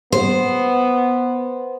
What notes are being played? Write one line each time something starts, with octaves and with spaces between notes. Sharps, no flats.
B3 C5